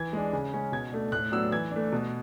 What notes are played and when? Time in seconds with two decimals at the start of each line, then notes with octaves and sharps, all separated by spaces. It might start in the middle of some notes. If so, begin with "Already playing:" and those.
Already playing: E3 G#6
0.13 G#3 D4
0.33 C#3
0.53 G#3 C#4
0.72 B2 G#6
0.92 A3 D4
1.12 A2 F#6
1.32 F#3 B3 D4 E6
1.52 E3 G#6
1.71 A3 D4
1.92 B2